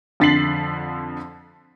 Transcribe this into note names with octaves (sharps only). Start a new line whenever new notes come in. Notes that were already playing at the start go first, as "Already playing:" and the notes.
F2 D3 A6 B6 C7 F#7